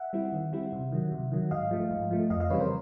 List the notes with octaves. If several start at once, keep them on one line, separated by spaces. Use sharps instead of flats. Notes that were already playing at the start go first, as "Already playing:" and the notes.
Already playing: E5 F#5
G3 C4 E4
D#3
G3 C4 E4
C3
D#3 F#3
C3
D#3 F#3
G#2 D#5 F5
F3 A3
G#2
F3 A3
F2 D#5 F5
D#5 F5
C#3 E3 G3 C4 B4 C#5
A#4 C5